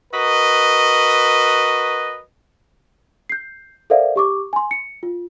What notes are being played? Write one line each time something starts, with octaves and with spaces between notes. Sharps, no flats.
F#4 A#4 B4 D#5
G6 C7
A4 A#4 C5 D5 E5 F5
G4 C#6 D6
G#5 C6
C#7
F4